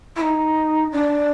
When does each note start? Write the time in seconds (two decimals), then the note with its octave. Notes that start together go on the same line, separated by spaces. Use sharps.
0.16 E4
0.21 D#4
0.92 D4